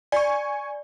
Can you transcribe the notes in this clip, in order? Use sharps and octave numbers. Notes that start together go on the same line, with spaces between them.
D5 G#5 C#6